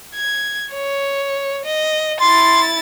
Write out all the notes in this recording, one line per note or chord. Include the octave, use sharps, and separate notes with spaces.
G#6
C#5
D#5
E4 C6 A6